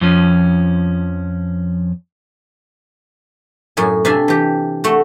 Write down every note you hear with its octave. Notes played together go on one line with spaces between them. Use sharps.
F2 F3 C#4
F#2 A2 G#5
C3 D4 E5 F5 G#5
E3 G4
A3 F#4